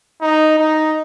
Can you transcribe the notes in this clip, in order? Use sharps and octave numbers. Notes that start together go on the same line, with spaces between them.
D#4
D#4